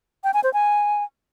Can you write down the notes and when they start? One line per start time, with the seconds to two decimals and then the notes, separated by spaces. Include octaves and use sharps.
0.24 G5
0.34 G#5
0.44 C5
0.53 G#5